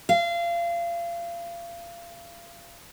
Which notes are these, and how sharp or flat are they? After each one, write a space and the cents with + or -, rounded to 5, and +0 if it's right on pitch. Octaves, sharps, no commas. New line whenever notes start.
F5 -30